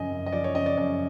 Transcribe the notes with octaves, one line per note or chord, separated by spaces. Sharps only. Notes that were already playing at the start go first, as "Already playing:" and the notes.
Already playing: F#2 C#3 F3 D#5 G#5
F#2
D#5
F3 D5
C#5
C#3 D#5
D5
F#2 D5